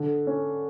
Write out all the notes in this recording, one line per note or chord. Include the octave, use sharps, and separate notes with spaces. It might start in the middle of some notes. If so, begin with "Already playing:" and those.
Already playing: D3
C#4